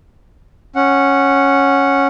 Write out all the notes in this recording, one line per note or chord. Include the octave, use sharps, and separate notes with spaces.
C#4 F#5